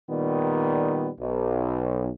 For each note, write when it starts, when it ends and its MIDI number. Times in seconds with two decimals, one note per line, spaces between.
0.10 1.10 46
0.10 1.10 51
0.10 1.10 55
0.10 1.10 59
1.20 2.10 35